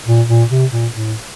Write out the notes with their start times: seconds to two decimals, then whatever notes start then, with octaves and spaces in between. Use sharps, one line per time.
0.07 A#2
0.28 A#2
0.50 C3
0.72 A#2
0.94 A2